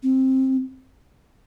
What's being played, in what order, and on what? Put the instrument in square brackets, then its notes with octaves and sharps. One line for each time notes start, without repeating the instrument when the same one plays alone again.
[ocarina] C4